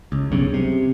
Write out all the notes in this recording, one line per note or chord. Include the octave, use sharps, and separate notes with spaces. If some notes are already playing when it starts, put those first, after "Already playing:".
C#2
B1 G2 C#3
C3